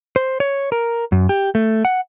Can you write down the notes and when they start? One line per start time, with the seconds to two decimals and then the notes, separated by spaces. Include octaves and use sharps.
0.16 C5
0.40 C#5
0.72 A#4
1.12 F#2
1.29 G4
1.55 A3
1.85 F#5